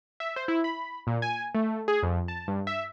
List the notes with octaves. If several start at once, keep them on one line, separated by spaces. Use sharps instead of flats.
E5
C5
E4
B5
A#2
G#5
A3
G#4
F2
A5
G2
E5